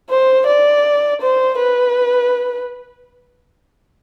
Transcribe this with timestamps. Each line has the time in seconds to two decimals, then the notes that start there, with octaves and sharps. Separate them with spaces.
0.09 C5
0.46 D5
1.21 C5
1.58 B4